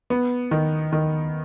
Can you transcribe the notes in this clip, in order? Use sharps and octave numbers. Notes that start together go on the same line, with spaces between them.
B3
D#3
D#3